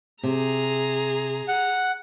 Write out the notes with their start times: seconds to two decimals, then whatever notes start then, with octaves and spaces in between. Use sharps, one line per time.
0.23 C3 G#4 A#5
1.48 F#5